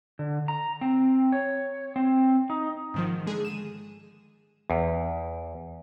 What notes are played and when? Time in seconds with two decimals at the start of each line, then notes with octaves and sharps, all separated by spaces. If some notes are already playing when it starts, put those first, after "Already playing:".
0.19 D3
0.48 A#5
0.81 C4
1.32 C#5
1.96 C4
2.50 D#4
2.94 G#2 D#3 F3
3.27 D3 G#3 G#4
3.45 D#7 E7
4.70 E2